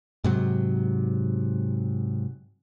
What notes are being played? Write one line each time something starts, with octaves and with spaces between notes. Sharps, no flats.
G#2 C3 F#3